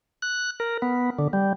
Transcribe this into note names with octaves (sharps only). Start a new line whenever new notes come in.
F#6
A#4
B3
D3
G3